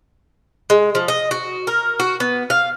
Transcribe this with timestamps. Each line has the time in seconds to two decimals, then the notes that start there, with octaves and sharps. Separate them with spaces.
0.70 G#3
0.95 F3
1.08 D#5
1.31 F#4
1.67 A#4
2.00 F#4
2.20 B3
2.50 F5